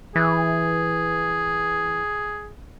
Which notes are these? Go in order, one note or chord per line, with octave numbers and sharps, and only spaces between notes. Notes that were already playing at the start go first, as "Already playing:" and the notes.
E3 G#4